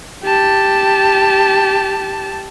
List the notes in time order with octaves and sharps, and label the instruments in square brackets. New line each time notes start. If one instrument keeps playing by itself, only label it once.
[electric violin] G4 A5